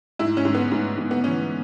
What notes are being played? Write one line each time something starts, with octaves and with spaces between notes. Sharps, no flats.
G#2 E4
C#4
G#2
B3
G#2
G#2
B3
E3 C#4